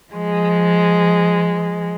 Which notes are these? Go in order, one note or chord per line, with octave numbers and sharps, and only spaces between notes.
F3 G#3